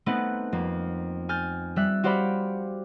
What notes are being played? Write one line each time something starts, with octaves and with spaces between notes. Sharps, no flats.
A3 B3 C4 D#4 B4 F#5
F2 A#3
G#5 F6 G6 A6
G3 E5 F#6
F#4 G4 C5 D5 F5 B5